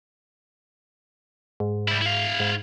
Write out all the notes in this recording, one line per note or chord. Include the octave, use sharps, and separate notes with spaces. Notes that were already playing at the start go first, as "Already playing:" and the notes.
G#2
G3 E4
E4 F5
G#2